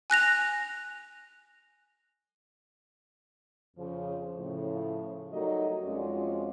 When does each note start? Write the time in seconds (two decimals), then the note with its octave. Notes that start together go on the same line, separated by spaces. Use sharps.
0.10 G#5 F#6 A#6 F7
3.76 F2 C#3 F3
4.37 A2 C#3 F3
5.31 F#3 G3 A3 D#4 A#4 D#5
5.84 F2 G#3 C#4 F4 F#4 D5